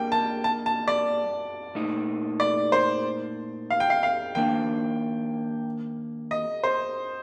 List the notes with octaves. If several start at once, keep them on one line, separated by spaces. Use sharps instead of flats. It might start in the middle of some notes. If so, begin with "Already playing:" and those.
Already playing: G3 A#3 D4 G5
A5
A5
A5
D5
A#2 A3 D#4
D5
C5
F5
G5
F5
F5
D#3 A#3 D4 G5
D#5
C5